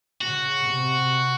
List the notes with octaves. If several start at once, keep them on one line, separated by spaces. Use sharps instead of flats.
C#3 F#4
C3